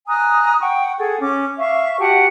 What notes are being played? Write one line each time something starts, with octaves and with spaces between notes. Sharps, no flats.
G#5 A#5 D#6 F#6
F#5 G5 C#6
G#4 A4 F#5
C#4 D6
E5 F5 C#6
F#4 G4 F#5 A5